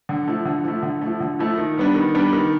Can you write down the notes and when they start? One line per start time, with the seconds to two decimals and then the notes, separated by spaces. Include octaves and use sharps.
0.09 D3
0.27 F3 A3
0.45 D3
0.64 F3 A3
0.83 D3
1.01 A3
1.06 F3
1.20 D3
1.39 F3 A3
1.57 D#3
1.77 G3 B3 D4
1.95 D#3
2.15 G3 B3 D4
2.33 D#3